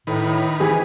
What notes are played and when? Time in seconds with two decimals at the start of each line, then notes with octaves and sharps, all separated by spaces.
0.07 A2 D#3 B4
0.60 G#2 E3 E4 G4 G#4 G#5